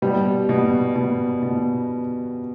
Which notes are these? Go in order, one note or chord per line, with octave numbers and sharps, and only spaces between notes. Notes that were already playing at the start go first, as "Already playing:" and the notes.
B2 G3
B2
B2
B2